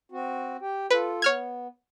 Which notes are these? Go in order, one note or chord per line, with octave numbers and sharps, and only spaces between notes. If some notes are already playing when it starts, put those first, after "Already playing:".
C4 F#4
G4 G5
F4 A4 B4
B3 C#5 F6 G#6